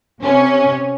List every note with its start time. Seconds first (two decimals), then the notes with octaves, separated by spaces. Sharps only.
0.21 C3 C#4